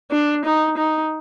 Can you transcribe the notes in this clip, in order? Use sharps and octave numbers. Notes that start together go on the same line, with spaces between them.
D4
D#4
D#4